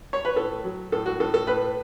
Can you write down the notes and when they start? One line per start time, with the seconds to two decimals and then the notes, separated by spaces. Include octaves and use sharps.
0.13 C#5
0.25 B4
0.36 A2 A4
0.64 F#3
0.92 A2 A4
1.06 F#4
1.20 A2 A4
1.34 A4
1.47 A2 B4